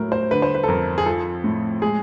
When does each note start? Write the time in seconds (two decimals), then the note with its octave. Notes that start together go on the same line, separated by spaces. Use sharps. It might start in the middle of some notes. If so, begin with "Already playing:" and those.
Already playing: A2 F#3 A#4
0.12 C5
0.31 D3 B4
0.42 C5
0.55 B4
0.63 A4
0.68 F2 A#4
0.98 G#4
1.06 F3 A4
1.44 A2
1.82 G#3 G#4